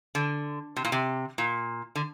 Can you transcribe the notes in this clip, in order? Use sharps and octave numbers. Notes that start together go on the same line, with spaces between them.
D3
C3
A#2
C3
A#2
D3